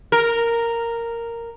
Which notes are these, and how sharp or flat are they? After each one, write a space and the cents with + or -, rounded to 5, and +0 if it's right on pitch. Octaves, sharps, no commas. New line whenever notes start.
A#4 -5